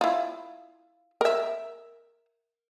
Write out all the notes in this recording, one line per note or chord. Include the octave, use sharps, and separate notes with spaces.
E4 F4
A#4 E5